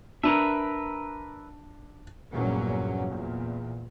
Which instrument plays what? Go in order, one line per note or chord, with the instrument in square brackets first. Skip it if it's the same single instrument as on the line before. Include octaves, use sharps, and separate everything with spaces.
[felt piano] D4 [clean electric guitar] A#4 B4 E5
[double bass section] A#1 E2 G2 F#3 A#3 C#4
E2 A#2